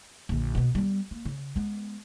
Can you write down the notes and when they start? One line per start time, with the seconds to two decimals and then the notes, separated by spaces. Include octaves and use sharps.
0.29 A#1 D3
0.55 B2 B3
0.75 G3 B3
1.11 A#3
1.26 C#3
1.56 G#3 B3